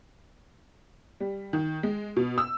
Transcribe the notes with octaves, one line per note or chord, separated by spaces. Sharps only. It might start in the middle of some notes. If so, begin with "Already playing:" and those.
G3
D#3
G#3
B2
E6